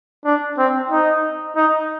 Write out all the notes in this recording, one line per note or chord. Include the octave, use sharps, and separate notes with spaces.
D4
C4
D#4
D#4